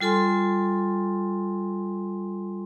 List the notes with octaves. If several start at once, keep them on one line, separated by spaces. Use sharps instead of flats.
G3 F4 A4 G#5 C6